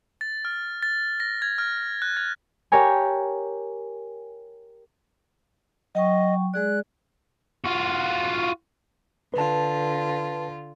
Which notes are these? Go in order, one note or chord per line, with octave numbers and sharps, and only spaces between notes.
A6
F6
A6
A#6
G#6
F6
F#6
G#6
G4 A#4 C#5 G#5
F#3 D#5 G5 C#6
G#3 G#4 D5 F#6
F4 F#4
D3 F4 B4 A5